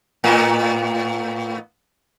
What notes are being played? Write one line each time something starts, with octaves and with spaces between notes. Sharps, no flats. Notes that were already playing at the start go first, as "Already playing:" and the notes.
A2 A#3 B3